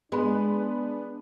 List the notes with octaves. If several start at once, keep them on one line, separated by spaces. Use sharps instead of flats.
G#3 B3 D4 B4